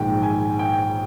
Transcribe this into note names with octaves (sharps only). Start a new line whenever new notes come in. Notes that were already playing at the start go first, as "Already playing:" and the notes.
Already playing: A#1 G#2 D#3 G5
G#5
G5